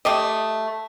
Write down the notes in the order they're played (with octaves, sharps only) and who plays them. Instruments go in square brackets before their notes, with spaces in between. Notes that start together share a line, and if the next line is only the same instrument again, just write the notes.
[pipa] A3 G4 D#5